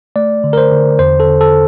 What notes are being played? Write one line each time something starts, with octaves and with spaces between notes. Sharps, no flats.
A3 D5
D3
A#4
C5
D3
E2 C5
A4
D3
A4